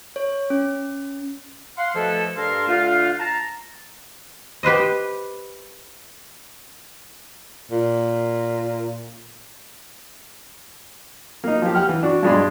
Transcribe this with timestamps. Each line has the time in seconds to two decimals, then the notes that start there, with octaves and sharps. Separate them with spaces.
0.16 C#5
0.50 C#4
1.78 F5 F#5 C6
1.95 B2 F3 A3 E4 A4
2.36 G2 A4 A#4 F5 A5 C6
2.67 D3 A3 D4 F4
3.18 A5 A#5
4.63 G4 B4 C5 D#5
7.71 A#2
11.44 A#3 D#4
11.62 F3 G4
11.75 F#5 G5 F6
11.89 E3
12.03 D4 F#4
12.23 G2 B2 G#3 D4 B5 C6